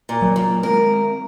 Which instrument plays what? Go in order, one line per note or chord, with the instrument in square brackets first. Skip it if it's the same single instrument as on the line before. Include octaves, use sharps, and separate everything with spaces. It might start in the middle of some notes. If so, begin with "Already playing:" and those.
[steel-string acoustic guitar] A#2
[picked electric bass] F#3 A#3
[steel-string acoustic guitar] A#2
[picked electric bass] G#3 C4 [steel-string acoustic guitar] A#4